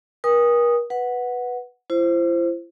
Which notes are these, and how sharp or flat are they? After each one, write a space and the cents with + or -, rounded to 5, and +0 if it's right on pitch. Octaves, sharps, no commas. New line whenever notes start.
A#4 +40 G#5 -45 D#6 -5
B4 +0 F#5 -5
E4 +45 C5 +0